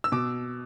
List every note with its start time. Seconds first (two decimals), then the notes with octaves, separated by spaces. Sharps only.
0.04 E6
0.12 B2 D6